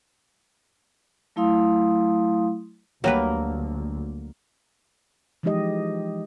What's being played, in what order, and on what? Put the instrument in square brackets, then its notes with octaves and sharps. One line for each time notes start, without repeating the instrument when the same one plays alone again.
[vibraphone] F#3 A3 E4 F5 C6 D#6
[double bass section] D2 [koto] F#3 G3 B4 [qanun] A#3
[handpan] E3 F3 G#3 D#4 G4 D#5